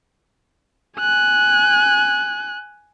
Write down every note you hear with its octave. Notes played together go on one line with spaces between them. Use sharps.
G#5 F#6